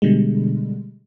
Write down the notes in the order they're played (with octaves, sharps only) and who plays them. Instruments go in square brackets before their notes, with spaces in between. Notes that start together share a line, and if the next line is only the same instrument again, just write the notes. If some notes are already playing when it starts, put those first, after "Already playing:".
[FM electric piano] B2 D3 G3 G#3